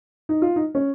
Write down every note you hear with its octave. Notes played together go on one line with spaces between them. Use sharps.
D#4
F4
D#4
C#4